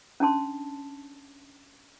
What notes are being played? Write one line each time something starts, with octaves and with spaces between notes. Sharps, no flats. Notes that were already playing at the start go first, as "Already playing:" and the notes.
C#4 D4 A5 C6